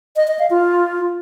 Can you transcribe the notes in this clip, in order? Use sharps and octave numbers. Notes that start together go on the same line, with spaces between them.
D#5
D#5
F5
F4